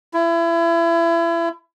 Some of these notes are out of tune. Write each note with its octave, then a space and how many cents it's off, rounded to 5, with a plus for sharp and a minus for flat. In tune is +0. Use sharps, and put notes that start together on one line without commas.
E4 +30